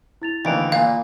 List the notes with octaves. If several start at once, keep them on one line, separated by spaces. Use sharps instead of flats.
E4 A6 F7
D2 D#3 E3 F5 D7 F7
A#2 F4 F5